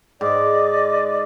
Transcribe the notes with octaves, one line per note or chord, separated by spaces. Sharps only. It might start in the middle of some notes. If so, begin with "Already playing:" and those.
G#2 D5 D#5 D6